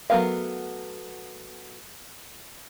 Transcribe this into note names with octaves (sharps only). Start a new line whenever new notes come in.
F#3 A3 B3 A#4 F5